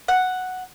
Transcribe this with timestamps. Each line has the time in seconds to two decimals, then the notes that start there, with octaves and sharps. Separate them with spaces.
0.08 F#5